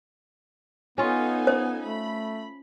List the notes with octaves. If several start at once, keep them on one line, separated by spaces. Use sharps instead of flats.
B3 C#4 D#4 F4 A4 G#5
C5
A3 B5